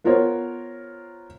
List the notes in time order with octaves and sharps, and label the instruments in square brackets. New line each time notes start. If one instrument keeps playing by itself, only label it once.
[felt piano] B3 F4 A#4 C5 C#5